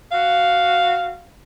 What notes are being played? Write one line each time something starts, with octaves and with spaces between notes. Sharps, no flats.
F#4 F5